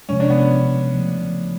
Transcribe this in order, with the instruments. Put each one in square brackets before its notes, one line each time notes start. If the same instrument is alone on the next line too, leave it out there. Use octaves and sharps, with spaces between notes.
[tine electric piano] C3 F3 G#3 [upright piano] C#4
[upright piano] D4
B3 C#4
[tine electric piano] C#3 F3 A3